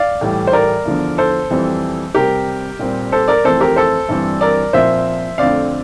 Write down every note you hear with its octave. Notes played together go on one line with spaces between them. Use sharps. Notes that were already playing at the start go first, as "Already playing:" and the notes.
Already playing: D5 F5
A2 E3 G3
C5
A#4 D5
E2 D3 F3
A4 C5
F2 E3 G3 C4
C3 G3 C4 G4 A#4
A#2 G3 C4
A4 C5
A#4 D5
F2 E3 A3 C4 A4 C5
G4 A#4
A4 C5
G2 E3 G3 C4
A#4 D5
A#2 F3 C4 C5 E5
F2 D3 A3 C4 D5 F5